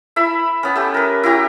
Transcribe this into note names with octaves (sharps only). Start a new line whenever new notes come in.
E4 E5 B5
B3 C#4
A3 G4
A#4 B4
E4 F#4 G4 A#5